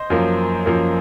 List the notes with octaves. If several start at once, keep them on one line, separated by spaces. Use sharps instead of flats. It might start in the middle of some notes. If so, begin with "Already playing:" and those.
Already playing: C5 D#5
F#2 F3 A#3
F#2 F3 A#3